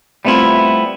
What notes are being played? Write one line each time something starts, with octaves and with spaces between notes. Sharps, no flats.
G3 A3 B3 C4 E4 F4